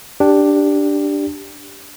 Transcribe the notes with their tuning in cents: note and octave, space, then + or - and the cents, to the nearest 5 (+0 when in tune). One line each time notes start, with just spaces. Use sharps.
D4 +0 G4 +0